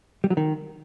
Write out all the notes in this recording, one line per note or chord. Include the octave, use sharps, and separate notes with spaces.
G3
F#3
D#3